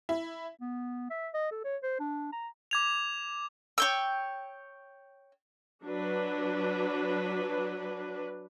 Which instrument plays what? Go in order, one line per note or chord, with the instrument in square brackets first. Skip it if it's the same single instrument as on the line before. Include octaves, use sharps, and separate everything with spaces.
[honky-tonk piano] E4
[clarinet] B3
E5
D#5
A4
C#5
C5
D4
A#5
[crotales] D6 G#6 F7
[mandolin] C#5 G5 E6
[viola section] F#3 D4 B4